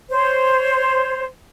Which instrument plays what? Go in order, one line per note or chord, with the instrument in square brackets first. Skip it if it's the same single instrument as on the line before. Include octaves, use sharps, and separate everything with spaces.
[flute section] C5 C#5